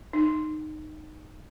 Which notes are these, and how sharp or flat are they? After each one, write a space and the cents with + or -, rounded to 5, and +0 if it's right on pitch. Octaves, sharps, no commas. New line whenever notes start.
D#4 -15